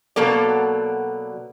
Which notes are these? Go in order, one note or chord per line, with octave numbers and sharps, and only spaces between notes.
B2 F#3 A#3 A4 D5